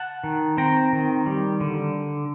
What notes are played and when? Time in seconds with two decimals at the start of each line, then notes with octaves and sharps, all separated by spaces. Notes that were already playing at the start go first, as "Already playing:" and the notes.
Already playing: F#5 A5
0.24 D#3
0.57 C4 G5 A#5
0.93 D#3
1.26 G3
1.60 D3